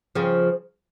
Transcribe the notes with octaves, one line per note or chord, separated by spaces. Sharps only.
C#3 F3